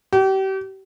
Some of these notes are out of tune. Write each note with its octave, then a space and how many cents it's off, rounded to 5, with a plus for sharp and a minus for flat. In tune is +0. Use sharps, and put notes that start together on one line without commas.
G4 -35